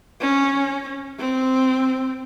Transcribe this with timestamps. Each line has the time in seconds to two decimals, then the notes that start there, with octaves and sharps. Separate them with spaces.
0.21 C#4
1.19 C4